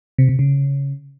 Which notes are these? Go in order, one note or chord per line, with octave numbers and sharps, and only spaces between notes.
C3
C3
C#3